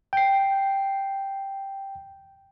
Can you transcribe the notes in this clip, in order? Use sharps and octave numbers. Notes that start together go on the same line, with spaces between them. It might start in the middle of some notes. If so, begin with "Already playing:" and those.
G5 C7